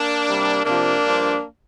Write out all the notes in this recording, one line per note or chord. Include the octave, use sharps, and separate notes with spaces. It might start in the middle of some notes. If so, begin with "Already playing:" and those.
Already playing: A#3 D4
C3 G3
C3 F3 A#3 D4
G2 F3